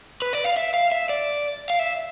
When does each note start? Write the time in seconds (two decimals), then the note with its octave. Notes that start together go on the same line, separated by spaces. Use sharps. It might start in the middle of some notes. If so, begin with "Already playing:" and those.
0.22 B4
0.33 D5
0.44 F5
0.57 E5
0.74 F5
0.92 E5
1.09 D5
1.70 F5
1.79 E5